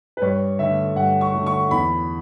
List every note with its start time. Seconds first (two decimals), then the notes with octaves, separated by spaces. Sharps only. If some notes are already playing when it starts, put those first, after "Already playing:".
0.17 B4
0.22 G2 C#5
0.59 D3 A3 E5
0.96 G2 F#5
1.21 C#6
1.34 D3 A3
1.46 C#6
1.71 E2 B5